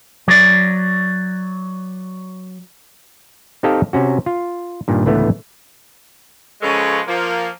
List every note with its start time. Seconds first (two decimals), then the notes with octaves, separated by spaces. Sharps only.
0.28 F#3 D5
3.63 C4 D#4 G4 A4 D#5 F5
3.93 C3 C#4 F#4
4.26 F4
4.88 G2 A#2 D#3
5.05 C#2 A2 D3 E3 A3 B3
6.62 C#3 F3 G#3 A4 B4 C#5
7.08 F3 A#3